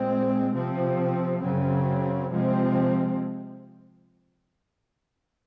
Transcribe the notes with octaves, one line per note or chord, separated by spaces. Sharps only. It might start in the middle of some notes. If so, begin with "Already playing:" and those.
Already playing: A#2 G#3 C4
C3 F3 C4
F#2 C#3 F#3 C4
C3 F3 G#3 C4